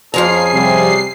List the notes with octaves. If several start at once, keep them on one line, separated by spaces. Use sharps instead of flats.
F2 F3 C#4 G#4 A#5 C7
C3 G3